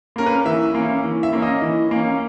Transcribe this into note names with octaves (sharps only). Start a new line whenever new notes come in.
A#3 C#4 A#4
B4
E3 E5
A#3 C#4
E3
E5
A#3 C#4
D#5
E3
A#3 C#4